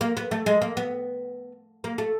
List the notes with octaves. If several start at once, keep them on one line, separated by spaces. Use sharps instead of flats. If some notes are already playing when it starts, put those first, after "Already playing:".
A#3
B3
A3
G#3
A#3
B3
A#3
A3